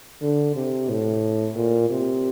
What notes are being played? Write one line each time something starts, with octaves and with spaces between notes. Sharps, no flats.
D3
C3
A2
A#2
C3